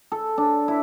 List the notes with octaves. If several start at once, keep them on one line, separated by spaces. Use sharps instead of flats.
A4
D4
E4